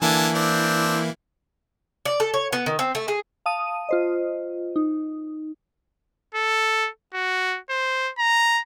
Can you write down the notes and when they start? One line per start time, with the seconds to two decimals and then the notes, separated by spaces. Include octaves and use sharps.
0.02 D3 E3 A#3 E4 G#5 A5
0.35 C4 D4
2.06 D5
2.20 A4
2.34 C#5
2.53 B3
2.66 D#3
2.79 C4
2.95 A3
3.08 G#4
3.46 F5 A5 D#6 D#7
3.89 F4 C5 D#5
4.76 D#4
6.35 A4
7.14 F#4
7.70 C5
8.18 A#5